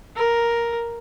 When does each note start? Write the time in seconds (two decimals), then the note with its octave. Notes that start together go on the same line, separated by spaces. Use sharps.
0.16 A#4